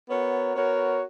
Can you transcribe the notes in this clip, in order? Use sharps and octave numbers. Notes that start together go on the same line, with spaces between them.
B3 F#4 A#4 C#5
B3 F#4 A#4 C#5